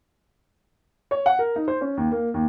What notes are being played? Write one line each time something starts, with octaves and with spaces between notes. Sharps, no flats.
C#5
F#5
A#4
D#4
C5
C#4
D#2
A#3
D#2